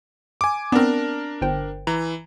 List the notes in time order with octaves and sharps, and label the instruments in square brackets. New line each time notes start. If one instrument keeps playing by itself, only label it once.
[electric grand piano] G#5 D6
[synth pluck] B3 C4 [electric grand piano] D4 A#4
[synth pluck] G1 C5 G5
[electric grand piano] E3 [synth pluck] A#5